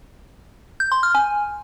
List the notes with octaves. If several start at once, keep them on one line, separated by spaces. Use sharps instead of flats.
G6
C6
F6
G#5